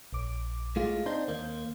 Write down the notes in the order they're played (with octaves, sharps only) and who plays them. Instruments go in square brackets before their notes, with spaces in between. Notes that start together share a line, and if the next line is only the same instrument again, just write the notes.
[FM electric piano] A#1 D6
[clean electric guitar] A2 G#3 F4
[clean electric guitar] C4 D4 D#4 [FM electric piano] C5 C6 G6
[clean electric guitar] D#2 A#3